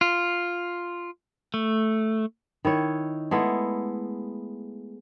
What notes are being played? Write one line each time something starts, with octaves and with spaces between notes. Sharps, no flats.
F4
A3
D#3 E4 C#5
G#3 A3 B3 E4